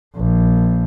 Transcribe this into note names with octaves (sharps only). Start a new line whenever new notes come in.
A#1